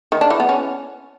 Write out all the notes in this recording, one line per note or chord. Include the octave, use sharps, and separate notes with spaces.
D#3
D4
E3
B3
C#4